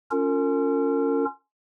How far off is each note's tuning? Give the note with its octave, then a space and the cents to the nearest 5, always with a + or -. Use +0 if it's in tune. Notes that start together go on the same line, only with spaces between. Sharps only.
C#4 +15 F4 +0 A#4 -40